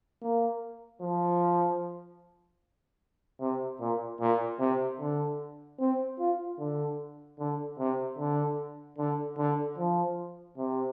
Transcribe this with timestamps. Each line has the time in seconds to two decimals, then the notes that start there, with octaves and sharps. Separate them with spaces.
0.22 A#3
1.01 F3
3.41 C3
3.81 A#2
4.20 A#2
4.60 C3
5.00 D3
5.80 C4
6.19 F4
6.59 D3
7.39 D3
7.79 C3
8.18 D3
8.98 D3
9.38 D3
9.78 F3
10.58 C3